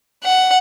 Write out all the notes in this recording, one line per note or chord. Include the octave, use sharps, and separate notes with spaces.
F#5